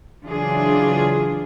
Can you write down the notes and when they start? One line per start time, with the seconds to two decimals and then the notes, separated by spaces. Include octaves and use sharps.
0.23 C#3 E3 F#3 D4 F4 G#4